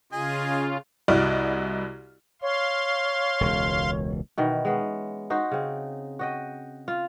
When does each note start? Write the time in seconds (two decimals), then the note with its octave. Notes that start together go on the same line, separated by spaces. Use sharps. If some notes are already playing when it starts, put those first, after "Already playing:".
0.12 C#3 F4 G#4 D#5 G#5
1.08 C2 E4 F#4 D5 D#5 F6
2.42 C#5 F5 C6
3.41 E1 C#2
4.38 B2 D#3 E3
4.65 G#3 B3 C#4
5.30 D#4 F#4 C5
5.51 C#3 C4
6.19 F#4 D#5 G5
6.88 F4